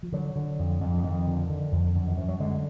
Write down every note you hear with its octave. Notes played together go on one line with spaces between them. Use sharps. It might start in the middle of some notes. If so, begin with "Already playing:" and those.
F3
D3 F#3
D3
F2
F2
D3
F2 D#3
D3
D3
F2
F#2 D3
D#3
F#2 F3
F#3
D3 G#3